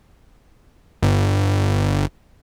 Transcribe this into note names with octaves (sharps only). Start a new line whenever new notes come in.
G1